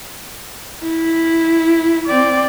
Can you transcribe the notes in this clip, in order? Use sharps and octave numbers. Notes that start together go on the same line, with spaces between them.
E4
C4 D5